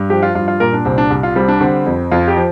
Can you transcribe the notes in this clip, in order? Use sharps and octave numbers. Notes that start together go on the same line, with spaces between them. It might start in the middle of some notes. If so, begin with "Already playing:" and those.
Already playing: G2
F3 G4
F4
G2 F4
F4
A#2 A#4
D4
C2 C4
D4
C2
F4
G3 C4
D4
D3 C4
F2
F2 F4
G4
F3